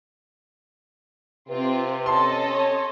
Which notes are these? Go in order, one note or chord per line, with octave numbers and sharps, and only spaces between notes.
C3 C4 F4 B4
C#4 A4 D#5 A5 C6
C#5